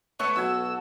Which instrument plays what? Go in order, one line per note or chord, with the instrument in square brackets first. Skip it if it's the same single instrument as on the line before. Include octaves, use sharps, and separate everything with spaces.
[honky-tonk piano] A3 [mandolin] B3 A4 [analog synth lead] C#5
[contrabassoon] B1 [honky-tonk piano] F#4 G#6 [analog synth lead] E6